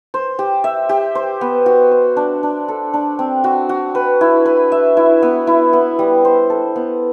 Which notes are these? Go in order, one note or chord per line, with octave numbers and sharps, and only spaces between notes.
C5
G4
E5
G4
C5
B3
F#4
C5
D4
D4
A4
D4
C4
F#4
F#4
B4
E4
B4
E5
E4
B3
E4
B3
G3
C5
A4
B3